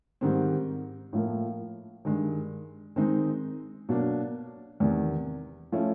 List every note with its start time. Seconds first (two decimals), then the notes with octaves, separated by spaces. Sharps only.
0.21 G#2 D#3 G3 C4
1.13 A2 F3 A#3
2.05 G2 D#3 G#3
2.96 D#3 G#3 C4 D#4
3.89 B2 F#3 A#3 D4
4.80 E2 C3 D#3
5.72 F3 A3 C#4 E4